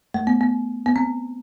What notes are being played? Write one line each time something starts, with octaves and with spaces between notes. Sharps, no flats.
A3
B3
B3
B3
C4